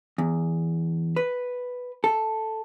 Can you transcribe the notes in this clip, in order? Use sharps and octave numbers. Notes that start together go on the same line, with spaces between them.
E2
B4
A4